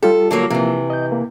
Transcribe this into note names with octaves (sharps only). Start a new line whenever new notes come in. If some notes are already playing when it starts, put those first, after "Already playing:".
G3 F4 G4 A4
D3 F#3 A#3
C3 E3 F3 A#3 A#4
D#5 G6
A#3